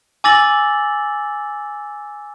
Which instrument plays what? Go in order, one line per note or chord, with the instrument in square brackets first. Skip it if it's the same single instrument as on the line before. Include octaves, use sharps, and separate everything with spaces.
[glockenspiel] G#5 D6 E6 A6 A#6 F#7